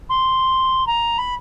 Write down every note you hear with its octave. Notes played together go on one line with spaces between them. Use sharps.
C6
A#5
B5